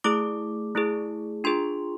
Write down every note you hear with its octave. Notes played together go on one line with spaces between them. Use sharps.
A3 E4 G#4 D6
A3 E4 G#4
D4 F4 G#4 C6